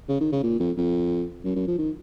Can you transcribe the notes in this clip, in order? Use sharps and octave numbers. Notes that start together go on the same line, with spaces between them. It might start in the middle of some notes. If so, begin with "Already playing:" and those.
C#3
D#3
C#3
A#2
F2
F2
F#2
F#2
F3
D#3